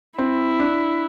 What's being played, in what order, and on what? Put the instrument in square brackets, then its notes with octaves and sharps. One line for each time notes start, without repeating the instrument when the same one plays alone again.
[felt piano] C4 [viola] E4
[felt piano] D4